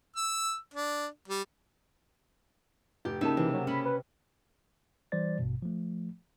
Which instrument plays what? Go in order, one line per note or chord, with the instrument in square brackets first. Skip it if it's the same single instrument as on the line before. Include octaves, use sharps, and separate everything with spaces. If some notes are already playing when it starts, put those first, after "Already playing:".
[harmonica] E6
D4
G3
[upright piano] F1 [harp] G4
[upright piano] C#3 A#3 A5 [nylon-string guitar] D#4 [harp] E5
[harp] C3 [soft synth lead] E3
[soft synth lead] F#3
[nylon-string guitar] C#4 [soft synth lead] B5
[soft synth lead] B4
[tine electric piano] E3 G3 C5 D5 A6
A1 G2 B2
F3 A3